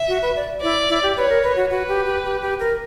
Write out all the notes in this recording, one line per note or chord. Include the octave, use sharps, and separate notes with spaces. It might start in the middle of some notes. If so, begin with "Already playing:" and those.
Already playing: E5
F#4
B4
D5
E4 D5
E4
G4
B4 C#5
A#4
B4
F#4
F#4 B4
G4
G4
G4
G4
A#4